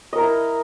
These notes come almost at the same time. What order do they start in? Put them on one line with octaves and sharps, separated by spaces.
D#5 A#4 A#5 E4